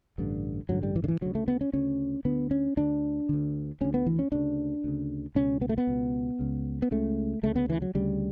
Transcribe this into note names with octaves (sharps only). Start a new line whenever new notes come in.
A1 G2 D3
A1 G2 D3 F#3
G3
E3
D3
E3
D2 C#3 F#3
A3
B3
C#4
D2 C#3 C#4
D2 D3 B3
C#4
D2 D3 D4
D2 D3
D2 D3 C#4
B3
E3
C#4
D2 C#3 D4
D2 C#3
C#2 B2 C#4
B3
A3
B3
C#2 B2
C#2 C#3
B3
C#2 C#3 A3
D2 C#3 A3
B3
E3
F#3
D2 C#3 G3